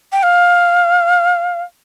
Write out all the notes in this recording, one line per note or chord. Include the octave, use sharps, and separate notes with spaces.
G5
F5